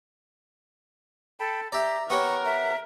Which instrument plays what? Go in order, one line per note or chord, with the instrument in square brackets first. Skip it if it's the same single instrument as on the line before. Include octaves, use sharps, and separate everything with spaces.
[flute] A4 [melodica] G5 A5 B5
[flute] G4 [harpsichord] D5 E5 [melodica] A#5
[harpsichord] B3 G4 C#5 [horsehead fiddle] A#4 [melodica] F#5 [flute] C#6
[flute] E5